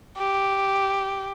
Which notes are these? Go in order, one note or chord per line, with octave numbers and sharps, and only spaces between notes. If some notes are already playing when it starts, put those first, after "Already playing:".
G4